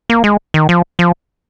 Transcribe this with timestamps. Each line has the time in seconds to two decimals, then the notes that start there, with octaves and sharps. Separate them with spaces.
0.10 A#3
0.24 G#3
0.54 D#3
0.69 F3
0.99 F3